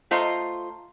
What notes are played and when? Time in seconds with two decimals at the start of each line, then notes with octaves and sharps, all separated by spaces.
0.11 A3 F4 C5 D#5 A#5